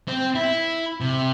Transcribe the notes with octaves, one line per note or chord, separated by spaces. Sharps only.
C4
E4
C3